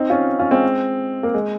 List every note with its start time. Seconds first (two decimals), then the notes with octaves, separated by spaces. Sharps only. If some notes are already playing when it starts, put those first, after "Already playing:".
Already playing: C4 D#4
0.10 C#4 F4
0.39 C#4 F4
0.51 G#3 C4
1.23 A#3
1.34 G#3